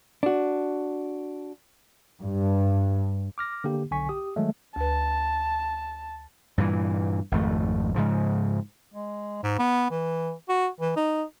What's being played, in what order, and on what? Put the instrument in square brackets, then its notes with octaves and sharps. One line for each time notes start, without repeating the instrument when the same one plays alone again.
[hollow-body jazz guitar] D4 F#4
[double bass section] G2
[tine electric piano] D6 F6 A#6
D3 A#3 G4
B1 D3 G#5 C#6 B6
G4 D#6
D#3 F#3 G#3 A3
[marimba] D2 B4 [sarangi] A5
[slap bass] G2 A#2 E3
G#1 F2 A3
G#2 C#3 F3
[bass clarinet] G#3
G#2
B3
E3
F#4
E3
D#4